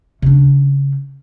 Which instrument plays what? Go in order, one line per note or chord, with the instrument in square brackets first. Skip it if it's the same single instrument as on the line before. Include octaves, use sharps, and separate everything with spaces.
[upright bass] C#3 D4